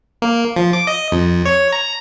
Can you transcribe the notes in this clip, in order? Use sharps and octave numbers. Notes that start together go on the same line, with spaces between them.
A#3
F3
D6
D#5
F2
C#5
A#5